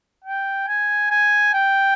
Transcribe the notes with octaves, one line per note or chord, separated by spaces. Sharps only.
G5
G#5
G#5
G5